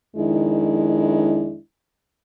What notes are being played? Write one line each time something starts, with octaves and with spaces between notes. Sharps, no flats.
F2 D#3 G#3 D4 E4